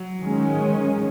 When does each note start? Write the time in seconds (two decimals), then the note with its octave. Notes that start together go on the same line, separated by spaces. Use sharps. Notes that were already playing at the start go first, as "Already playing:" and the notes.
Already playing: F#3
0.21 D#3 G#3 C#4